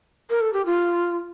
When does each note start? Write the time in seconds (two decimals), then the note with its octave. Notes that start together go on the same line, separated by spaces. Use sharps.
0.30 A#4
0.41 A4
0.53 G4
0.66 F4